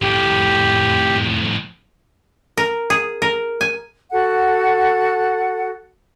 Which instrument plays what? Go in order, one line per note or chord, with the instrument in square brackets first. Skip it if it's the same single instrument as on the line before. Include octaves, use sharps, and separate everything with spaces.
[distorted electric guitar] F2 A2 [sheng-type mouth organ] G4
[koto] A#4
G#4
A#4
G#5
[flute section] F#4 A4 F#5